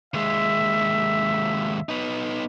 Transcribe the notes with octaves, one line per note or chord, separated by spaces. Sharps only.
D#2 G#3 E5
B3 D#4